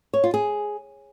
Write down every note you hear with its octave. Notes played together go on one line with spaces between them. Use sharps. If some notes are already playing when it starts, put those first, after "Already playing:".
C#5
F4
G#4